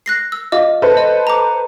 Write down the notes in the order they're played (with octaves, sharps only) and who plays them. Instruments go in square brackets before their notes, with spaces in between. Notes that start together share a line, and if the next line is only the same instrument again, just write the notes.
[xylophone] F#6 A#6 C7
E6
[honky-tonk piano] F4 [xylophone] D#5 D6
[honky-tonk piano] A4 B4 C5
[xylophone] D#5
A#5 D6